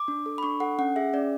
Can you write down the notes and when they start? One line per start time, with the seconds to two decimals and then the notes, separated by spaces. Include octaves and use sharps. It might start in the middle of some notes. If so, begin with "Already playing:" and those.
Already playing: D6
0.08 D4
0.26 A4
0.38 B5
0.43 D4 C#6
0.60 A4 F#5
0.78 C#4 F#5
0.96 G#4 E5
1.13 C#4 D5